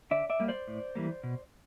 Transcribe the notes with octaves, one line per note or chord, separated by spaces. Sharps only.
D3 D5 E5
D5 E5
G3 A#3
C5 D5
A2
E3 G3 A#3
B2